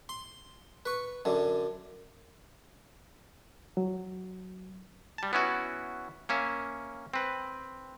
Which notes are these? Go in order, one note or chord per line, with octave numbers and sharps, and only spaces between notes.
C6
B4 C#6
F#2 D3
F#3
G3 A5
B3 C#4 E4 F#4
A#3 C#4 E5
C4 B4